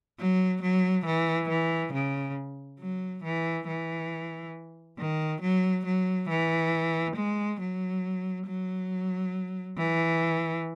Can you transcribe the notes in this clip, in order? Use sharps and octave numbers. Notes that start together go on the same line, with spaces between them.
F#3
F#3
E3
E3
C#3
F#3
E3
E3
D#3
F#3
F#3
E3
G#3
F#3
F#3
E3